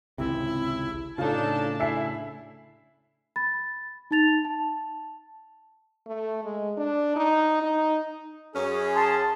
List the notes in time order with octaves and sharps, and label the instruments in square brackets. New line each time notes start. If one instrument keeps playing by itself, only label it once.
[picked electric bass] G#1 C#2 C3 [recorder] E4
[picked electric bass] A2 C#3 [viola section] D4 A4 A5 [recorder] D#4 [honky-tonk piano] F4
[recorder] E4 [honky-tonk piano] E5 G#5 C7
[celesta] B5 A6
D#4 A5 A6 F7
A5
[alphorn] A3
G#3
D4
D#4
D#4
[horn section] F#2 C#4 [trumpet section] G#4
[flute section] A5 C6